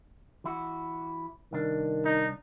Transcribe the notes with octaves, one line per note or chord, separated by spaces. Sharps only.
E3 E4 F#4
C2 D#3 D4
D#4